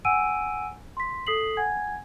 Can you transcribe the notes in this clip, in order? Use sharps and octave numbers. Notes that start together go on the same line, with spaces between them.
F#5 G#5 E6 D7 D#7
C6 B6
A4 D#6 B6 C7 F#7
F#5 G#5 G#6